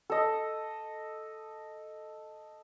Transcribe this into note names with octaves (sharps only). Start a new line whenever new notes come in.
A4 D#5